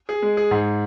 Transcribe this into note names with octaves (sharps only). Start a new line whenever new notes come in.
G#4
G#3
G#4
G#2